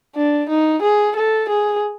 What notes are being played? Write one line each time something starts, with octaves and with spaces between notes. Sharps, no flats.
D4
D#4
G#4
A4
G#4